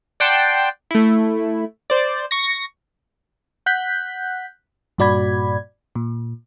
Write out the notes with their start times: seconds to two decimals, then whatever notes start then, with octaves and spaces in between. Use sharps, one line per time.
0.20 D5 F#5 G5 A5 C6
0.91 A3 E4
1.90 C5 D5
2.31 C#6 A#6
3.66 F#5 F#6 G6 B6
4.98 G2 A#2 F#4 D5 B5 G#6
5.95 A#2